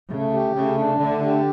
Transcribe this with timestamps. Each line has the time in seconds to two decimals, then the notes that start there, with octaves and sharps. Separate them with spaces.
0.12 C#3 A3
0.34 G4
0.56 C#3 A3
0.78 D4
1.00 D3 A3
1.22 G4